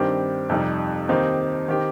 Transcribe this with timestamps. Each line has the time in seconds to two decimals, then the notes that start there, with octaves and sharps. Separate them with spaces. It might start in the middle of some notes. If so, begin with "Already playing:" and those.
Already playing: G2 D#3 C4 G4
0.49 F2 C3 G3 D#4
1.09 D#2 D#3 C4 D#4 G4
1.68 D#3 C4 G4